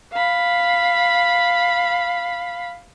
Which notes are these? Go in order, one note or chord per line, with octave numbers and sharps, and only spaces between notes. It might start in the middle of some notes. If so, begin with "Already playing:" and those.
F5 B5